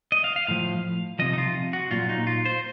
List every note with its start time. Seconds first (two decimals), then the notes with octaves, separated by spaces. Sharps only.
0.12 D#5
0.24 F5
0.36 F5
0.47 A2 F3 F5
1.19 C3 F3 D#5
1.33 D#4
1.38 F4
1.73 F#4
1.91 A#2 F#3 F4
2.09 D#4
2.27 F4
2.46 C5